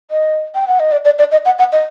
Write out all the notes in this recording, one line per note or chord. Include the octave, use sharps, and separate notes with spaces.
D#5
G5
F#5
D#5
D5
D5
D5
D#5
F#5
F#5
D#5